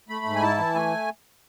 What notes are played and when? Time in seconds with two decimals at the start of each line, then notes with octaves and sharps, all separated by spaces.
0.09 A3 B5
0.25 G#2
0.36 G#5
0.42 E4 A5
0.58 E3
0.75 A3 G#5